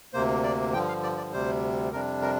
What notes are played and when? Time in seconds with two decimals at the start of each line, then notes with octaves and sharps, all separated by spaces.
0.14 D2 C3 A#3 C5
0.43 D5
0.73 G2 D3 F3 G5
0.88 F5
1.03 D5
1.18 D5
1.33 D2 C3 G3 C5
1.92 F2 C3 G3 D4 A#4
2.22 A#4